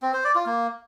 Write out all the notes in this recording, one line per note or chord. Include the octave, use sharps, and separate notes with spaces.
C4
C5
D5
F4
A#3